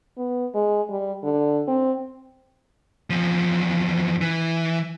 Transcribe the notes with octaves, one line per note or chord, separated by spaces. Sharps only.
B3
G#3
G3
D3
C4
E2 F3
E3